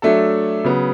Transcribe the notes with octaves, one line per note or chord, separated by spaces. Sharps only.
F#3 A3 D4 A4
C#3 F#3 B3